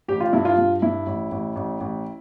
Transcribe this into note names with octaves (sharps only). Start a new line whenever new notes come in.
A1 G4
F4
G2 E4
F4
G2
G2 E4
A1
A1
A1
A1